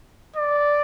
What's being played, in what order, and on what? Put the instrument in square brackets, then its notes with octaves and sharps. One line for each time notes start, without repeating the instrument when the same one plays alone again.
[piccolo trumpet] D5